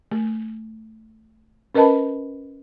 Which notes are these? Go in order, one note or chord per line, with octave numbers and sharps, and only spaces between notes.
A3
C#4 A#4 B4 D#5 A5 B5